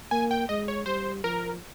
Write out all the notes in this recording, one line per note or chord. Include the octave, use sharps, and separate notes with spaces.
A#3 G#5
G5
G#3 D#5
C#5
G3 C5
F3 A#4